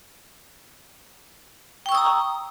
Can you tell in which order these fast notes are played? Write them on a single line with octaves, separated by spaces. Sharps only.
G5 C#6 E6 D#6 A#5